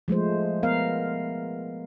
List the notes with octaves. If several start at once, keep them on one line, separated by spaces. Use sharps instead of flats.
F3 G#3 A3 C5
B3 A#4 F5